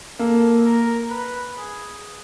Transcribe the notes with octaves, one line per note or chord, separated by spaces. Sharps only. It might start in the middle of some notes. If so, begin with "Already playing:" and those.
A#3 A4
A#4
B4
G#4